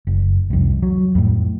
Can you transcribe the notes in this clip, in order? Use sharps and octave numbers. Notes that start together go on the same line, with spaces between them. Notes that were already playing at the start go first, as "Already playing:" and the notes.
F#1
C2 F2
F#3
F2 A2